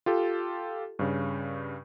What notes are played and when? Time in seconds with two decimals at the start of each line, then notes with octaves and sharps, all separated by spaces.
0.06 F4 G4 A4
0.99 G2 C#3